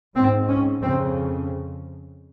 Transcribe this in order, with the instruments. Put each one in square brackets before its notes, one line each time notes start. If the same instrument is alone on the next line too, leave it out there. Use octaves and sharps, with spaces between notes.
[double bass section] G#2 C4
C#4
F2 C#3 C4